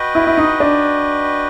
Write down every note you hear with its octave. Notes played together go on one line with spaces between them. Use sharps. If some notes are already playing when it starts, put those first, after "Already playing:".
Already playing: F#4 B4 D#5 G5
E4
E4
D#4
D4